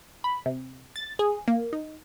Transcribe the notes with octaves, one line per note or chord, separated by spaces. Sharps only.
B5
C3
A6
G#4
A#3
D#4